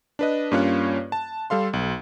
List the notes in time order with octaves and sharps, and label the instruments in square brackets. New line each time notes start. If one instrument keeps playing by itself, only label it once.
[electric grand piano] D4 B4 D#5
G2 A#3 C#4 F4 C#5 F#6
A5
G3 A4 F5 C6
B1